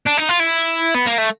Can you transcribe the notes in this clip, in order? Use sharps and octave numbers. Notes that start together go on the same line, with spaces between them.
D4
D#4
F4
E4
B3
A#3
A3